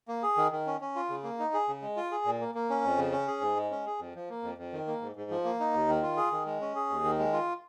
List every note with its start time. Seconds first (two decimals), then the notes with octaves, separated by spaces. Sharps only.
0.08 A#3
0.23 G#4
0.37 D#3
0.52 D#3
0.67 C#4
0.81 C#4
0.96 F4
1.10 C#3
1.24 A#3
1.39 D#4
1.54 G#4
1.68 C#3
1.82 G#3
1.97 F4
2.11 G#4
2.25 A#2
2.41 A#3
2.55 A#3
2.70 C#4
2.84 F2
2.98 C#3
3.12 C#4
3.27 G#4
3.41 G#2
3.56 G#3
3.71 C#4
3.86 G#4
3.99 F2
4.15 F3
4.29 A#3
4.43 F2
4.58 F2
4.73 D#3
4.87 A#3
5.01 G#2
5.16 G#2
5.31 F3
5.44 A#3
5.60 D#4
5.73 D#2
5.88 D#3
6.02 F4
6.17 G#4
6.32 D#3
6.46 G#3
6.61 C#4
6.76 G#4
6.90 D#2
7.04 D#3
7.18 G#3
7.33 F4